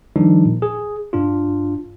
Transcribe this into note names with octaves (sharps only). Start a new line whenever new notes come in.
D#3 F3 G3 D4 D#4
A#2
G#4
G2 D4 F4